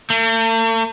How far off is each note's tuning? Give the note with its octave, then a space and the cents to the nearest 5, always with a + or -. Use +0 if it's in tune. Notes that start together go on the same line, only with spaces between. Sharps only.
A3 +45